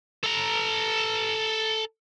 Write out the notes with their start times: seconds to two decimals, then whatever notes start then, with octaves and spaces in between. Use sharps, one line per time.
0.24 A4 A#5